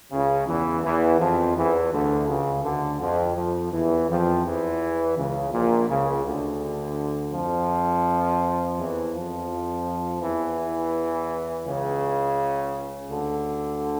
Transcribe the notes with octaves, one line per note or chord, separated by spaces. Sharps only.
C#2 C#3
E2 E3
E2 E3
F2 F3
E2 E3
D2 D3
C#2 C#3
D2 D3
F2 F3
F2 F3
E2 E3
F2 F3
E2 E3
C#2 C#3
A#1 A#2
C#2 C#3
D2 D3
F2 F3
E2 E3
F2 F3
E2 E3
C#2 C#3
D2 D3